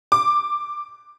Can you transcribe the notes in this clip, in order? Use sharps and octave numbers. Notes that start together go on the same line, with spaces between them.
D6